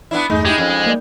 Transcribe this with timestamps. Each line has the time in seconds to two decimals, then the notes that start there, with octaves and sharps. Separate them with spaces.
0.11 B3 D4 E4
0.30 E2 G2 G#3 A3 D#4
0.45 G#3 D#4 E4 G4
0.58 F2 C#4 D#5
0.86 A#3 D5